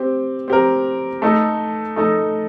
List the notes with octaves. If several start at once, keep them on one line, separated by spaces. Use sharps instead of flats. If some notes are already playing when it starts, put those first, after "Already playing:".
Already playing: C4 G4
C4 G4 A#4
A3 D#4 A4 D#5
A3 D#4 A4 D#5